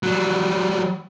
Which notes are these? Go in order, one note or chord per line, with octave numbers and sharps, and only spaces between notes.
F#3 G3